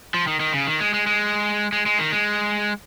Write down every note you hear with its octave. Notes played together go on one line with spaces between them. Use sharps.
F3
D#3
D#3
C#3
D#3
G#3
G#3
G#3
G#3
G#3
D#3
G#3